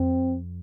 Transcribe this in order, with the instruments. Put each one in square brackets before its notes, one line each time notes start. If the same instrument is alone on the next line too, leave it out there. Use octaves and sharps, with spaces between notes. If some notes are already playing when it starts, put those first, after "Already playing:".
Already playing: [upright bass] F2 [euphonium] C4